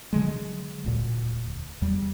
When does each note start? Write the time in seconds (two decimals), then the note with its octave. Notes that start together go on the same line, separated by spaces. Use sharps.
0.13 D3 F#3 G#3
0.84 E1 D2 A#2
1.82 E2 G3